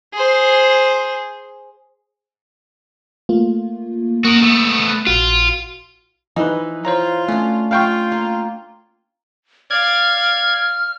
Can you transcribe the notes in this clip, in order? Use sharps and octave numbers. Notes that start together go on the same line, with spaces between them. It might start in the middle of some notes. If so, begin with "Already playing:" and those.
G#4 C5
A3 A#3 F4
A#3 F#4 A#4 C#6 D#6
A3 B3
B5 F#6 A6
A#1 F4 F#4
E3 F3 D#4 B4 E5 C6
F4 C5 C#5 A#5
A3 C#4 D4
F4 F5 G5 C#6
A#3
D5 F5 F6 G#6